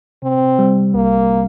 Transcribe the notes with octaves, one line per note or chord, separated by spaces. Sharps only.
C3 C4
G3
C2 A#3